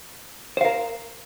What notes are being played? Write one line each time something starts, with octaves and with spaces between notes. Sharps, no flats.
A#4 C5 F5